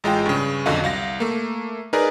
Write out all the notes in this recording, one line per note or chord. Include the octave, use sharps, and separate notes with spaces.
A1 G#3 F4 G5
G2 C#3
B1 F2 D3 F#4 D#5 F5
C2 F5 A#6
A3 A#3
D#4 G#4 A#4 B4 D5